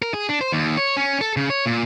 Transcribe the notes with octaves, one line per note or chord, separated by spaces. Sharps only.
A#4
G#4
D4
C5
D#2
C#5
C#4
A4
C#3
C#5
A#2